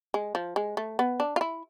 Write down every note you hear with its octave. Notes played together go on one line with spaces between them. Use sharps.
G#3
F3
G#3
A3
B3
D4
F4
E4